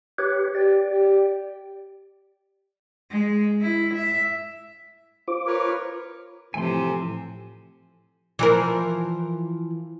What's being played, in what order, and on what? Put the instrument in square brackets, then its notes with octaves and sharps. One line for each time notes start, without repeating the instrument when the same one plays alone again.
[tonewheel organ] G4 B4 C#5
[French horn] G4 [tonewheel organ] D5
[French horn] G4
[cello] G#3
E4
E5
[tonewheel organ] F4 C5 D6
[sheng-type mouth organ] A#4 B4 C#5
[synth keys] A2 E3 A4 [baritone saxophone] C3 [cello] F3 [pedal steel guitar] G#5 C6
[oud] E3 F3 A#4